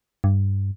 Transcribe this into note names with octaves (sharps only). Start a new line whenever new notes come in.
G2